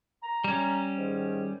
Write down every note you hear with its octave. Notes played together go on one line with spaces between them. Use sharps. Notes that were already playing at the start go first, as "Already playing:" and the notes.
A#5
G3 C#4
G#2 D#3